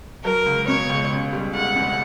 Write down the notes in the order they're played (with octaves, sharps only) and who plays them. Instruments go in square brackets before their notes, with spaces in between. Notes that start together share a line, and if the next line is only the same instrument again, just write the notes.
[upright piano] F#3 [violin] A#4
[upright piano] C#2
[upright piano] B2 [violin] C#5
[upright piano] C#2
C#3
G3
[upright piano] E1 [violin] F#5
[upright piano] E2